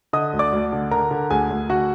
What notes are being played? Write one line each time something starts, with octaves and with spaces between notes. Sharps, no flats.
D3 D#5 D#6
D2
D5 D6
D2
D3
D3 A#4 A#5
D3
D2 G#4 G#5
D2
D3 F#4 F#5